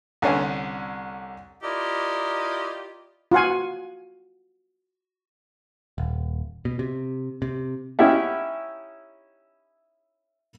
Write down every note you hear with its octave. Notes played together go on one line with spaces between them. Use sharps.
C2 D3 C#4 G#5
E4 F4 G4 A#4 D5 D#5
F4 F#4 F#5 G#5
D#1
B2
C3
C3
C#4 D#4 E4 G4 E5 F#5